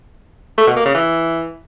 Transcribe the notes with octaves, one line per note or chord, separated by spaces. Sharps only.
A3
B2
A#3
C#3
E3